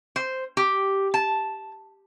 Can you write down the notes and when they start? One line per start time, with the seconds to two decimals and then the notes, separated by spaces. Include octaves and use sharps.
0.16 C5
0.57 G4
1.14 A5